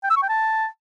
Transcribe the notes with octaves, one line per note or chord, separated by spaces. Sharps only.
G5
E6
C#6
G5
A5